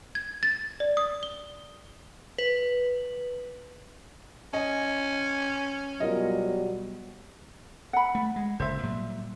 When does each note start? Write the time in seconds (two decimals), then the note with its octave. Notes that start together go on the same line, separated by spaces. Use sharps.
0.15 G#6
0.43 A6
0.80 D5
0.97 D#6
1.23 G7
2.38 B4
4.53 C#4 D#5 G#5
6.00 B2 F#3 G3 F4 A#4 D#5
7.93 F#5 B5
8.15 A3
8.36 G#3
8.60 F#1 C#2 A#2 C5 E5
8.83 A#2 F#3 G3